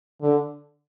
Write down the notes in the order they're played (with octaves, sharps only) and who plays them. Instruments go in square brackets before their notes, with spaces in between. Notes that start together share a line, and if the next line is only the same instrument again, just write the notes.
[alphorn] D3